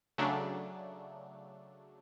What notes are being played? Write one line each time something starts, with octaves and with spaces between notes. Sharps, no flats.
C#3 F#3 A3 D4